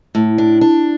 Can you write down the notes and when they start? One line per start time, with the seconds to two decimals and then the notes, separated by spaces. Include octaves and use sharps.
0.15 A2
0.38 D4
0.61 D4